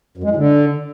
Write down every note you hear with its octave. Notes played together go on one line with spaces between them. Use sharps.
F#2
G#3
A2
D3